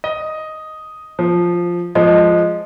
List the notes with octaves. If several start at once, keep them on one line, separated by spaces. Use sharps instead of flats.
D#5
F3
F3 G#3 D#5